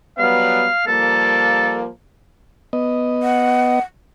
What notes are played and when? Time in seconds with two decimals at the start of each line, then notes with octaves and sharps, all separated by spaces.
0.18 F#3 G3 B3 F5
0.87 F3 G3 A#3 A4
2.73 B3 D#5
3.23 F#5